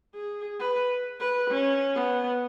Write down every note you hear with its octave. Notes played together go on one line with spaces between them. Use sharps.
G#4
B4
B4
C#4
B3